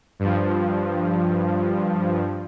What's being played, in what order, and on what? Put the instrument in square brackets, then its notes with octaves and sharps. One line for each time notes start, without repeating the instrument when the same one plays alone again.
[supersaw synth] G2 F3